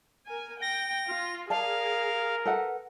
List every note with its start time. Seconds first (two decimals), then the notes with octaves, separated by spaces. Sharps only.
0.27 A#4 G#5
0.62 G5 A#6
1.07 F4
1.50 G#4 A#4 D5 F5 A5
2.46 A4 B4 F#5